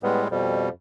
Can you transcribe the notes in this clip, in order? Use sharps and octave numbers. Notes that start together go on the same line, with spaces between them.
A2 G3 G#3 B3
F2 B2 G3